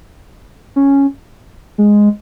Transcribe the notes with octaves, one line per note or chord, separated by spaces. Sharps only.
C#4
G#3